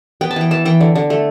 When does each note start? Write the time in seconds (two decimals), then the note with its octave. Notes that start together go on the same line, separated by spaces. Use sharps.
0.21 B3 G5
0.31 A5
0.36 E3 G5
0.51 E3 A5
0.65 E3 G5
0.81 D3
0.95 D3
1.10 A3